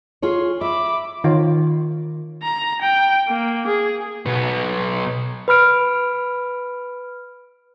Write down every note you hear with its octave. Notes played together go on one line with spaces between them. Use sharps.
F4 G#4 C#5
E5 B5 D6
D#3 F4 C#5
A#5
G5
A#3
G#4
B1 B3
B4 B5 F6 D7